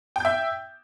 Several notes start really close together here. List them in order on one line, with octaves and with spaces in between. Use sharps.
G5 G6 E5